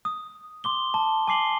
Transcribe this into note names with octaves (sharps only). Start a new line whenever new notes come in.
D#6
C6 D6 G7
A5
G#5 D6 C7 F#7 G7